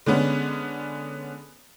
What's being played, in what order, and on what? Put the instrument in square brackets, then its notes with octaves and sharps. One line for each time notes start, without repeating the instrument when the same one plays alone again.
[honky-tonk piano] D3 G#3 B3 C#4